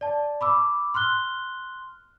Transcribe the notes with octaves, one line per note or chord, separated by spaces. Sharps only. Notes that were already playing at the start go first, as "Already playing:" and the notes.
D5 A5
B5 D6 E6
C6 F6 F#6 G7